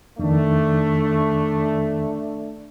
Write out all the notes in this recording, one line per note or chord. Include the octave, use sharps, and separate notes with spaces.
F2 D#3 A3 D4